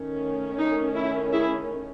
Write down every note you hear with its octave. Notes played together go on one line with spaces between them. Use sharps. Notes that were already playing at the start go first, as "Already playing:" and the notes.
Already playing: D#3 A3 C#4
D#4
E4
E4 G#4